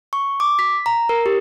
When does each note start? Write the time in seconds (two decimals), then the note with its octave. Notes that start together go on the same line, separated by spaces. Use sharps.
0.13 C#6
0.40 D6
0.59 B6
0.86 A#5
1.09 A#4
1.26 G4